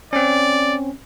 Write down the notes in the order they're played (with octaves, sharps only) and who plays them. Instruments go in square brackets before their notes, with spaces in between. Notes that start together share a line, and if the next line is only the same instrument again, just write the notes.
[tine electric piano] C4 C#4 [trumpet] D5